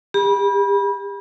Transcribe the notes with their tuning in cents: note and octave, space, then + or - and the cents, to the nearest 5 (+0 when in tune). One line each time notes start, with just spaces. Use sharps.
G4 +40 B5 -25